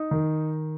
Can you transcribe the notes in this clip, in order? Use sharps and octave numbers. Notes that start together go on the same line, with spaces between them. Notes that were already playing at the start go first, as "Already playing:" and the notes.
Already playing: D#4
D#3